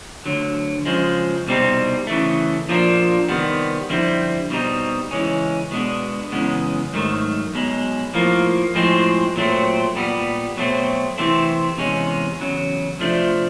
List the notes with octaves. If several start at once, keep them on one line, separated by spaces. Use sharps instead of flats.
D2 D3 F#3
C#3 F3 G#3
C2 B2 G3 C4 D#4
C#3 E3 A3
A#2 F3 A#3 D4
C3 D#3 G3 B3
F2 D3 G3 C4 E4
B2 G3 C4 D#4
C#3 E3 G#3 C#4
B2 G#3 B3 D4
F#2 C#3 E3 G#3 B3
G#2 D#3 F#3 A3
B1 B2 G#3
A2 F3 A#3
A2 F3 G#3 C4
A#2 F#3 A3 C4
A#2 G3 B3
B2 F#3 A3 C4
C3 E3 A3 C4
E2 C3 E3 G#3 C#4
E2 C#3 F#3
C3 F3 A3 D4